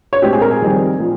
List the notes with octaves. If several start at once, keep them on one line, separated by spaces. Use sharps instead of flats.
C#5
A#2 G#3 C4 G4
G#4
A#4
G#4
F2 D#3 G3 C4
A#2 F3